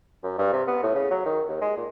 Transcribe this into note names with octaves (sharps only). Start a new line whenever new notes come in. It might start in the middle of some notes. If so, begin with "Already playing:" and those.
F#2
G2
C3
B3
A2
C#3
F#3
D#3
D#2
G#3
A#2